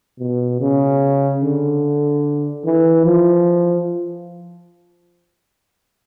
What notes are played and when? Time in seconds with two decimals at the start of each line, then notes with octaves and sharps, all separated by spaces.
0.19 B2
0.60 C#3
1.42 D3
2.65 E3
3.05 F3